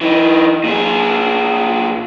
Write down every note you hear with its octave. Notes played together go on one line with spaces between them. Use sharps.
E3 D#4
A#2 G#4